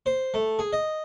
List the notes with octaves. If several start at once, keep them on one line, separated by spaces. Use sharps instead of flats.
C5
A3
G#4
D#5